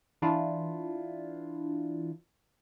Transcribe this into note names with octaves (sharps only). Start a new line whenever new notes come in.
E3 D4 E4 F4